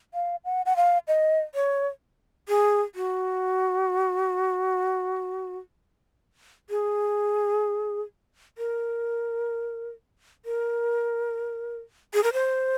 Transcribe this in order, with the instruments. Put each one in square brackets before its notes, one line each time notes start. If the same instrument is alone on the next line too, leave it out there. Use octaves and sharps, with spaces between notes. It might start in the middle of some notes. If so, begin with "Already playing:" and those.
[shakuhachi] F5
F#5
F#5
F5
D#5
C#5
G#4
F#4
G#4
A#4
A#4
G#4
A#4
C5